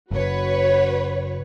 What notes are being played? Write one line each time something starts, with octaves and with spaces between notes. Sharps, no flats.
F#1 F#4 B4 C#5